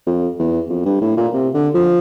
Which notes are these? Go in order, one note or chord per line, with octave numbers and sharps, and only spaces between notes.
F2
E2
F2
G2
A2
A#2
C3
D3
F3